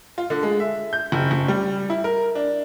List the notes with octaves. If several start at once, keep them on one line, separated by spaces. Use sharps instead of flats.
F4
D3
G#3
E5
G6
F#1
F#1
G3
E4
A#4
D4